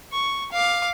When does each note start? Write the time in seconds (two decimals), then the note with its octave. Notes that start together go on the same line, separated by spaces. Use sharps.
0.12 C#6
0.52 F5 D6